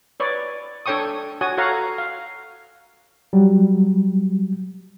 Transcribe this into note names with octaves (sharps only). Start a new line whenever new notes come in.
B4 C#5 D5
D4 A4 C#5 G5 C#6 D#6
F#4 C#5 G#5 D#6
F#4 A4 C#5 F5 F#5 A#5
F5
F#3 G3